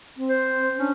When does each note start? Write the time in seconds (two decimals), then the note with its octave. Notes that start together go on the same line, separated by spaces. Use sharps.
0.17 C4
0.29 C5
0.78 C#4 D4